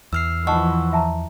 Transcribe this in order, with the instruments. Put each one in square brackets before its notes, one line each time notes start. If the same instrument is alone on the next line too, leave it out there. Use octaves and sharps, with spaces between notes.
[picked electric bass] E2 [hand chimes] E6 F6 C7
[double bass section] E3 F3 [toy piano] D#5 A5 [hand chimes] F#5 C#6 E6
[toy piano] E5 A5 A#5